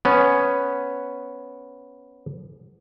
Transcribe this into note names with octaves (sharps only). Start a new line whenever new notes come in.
B3 C#4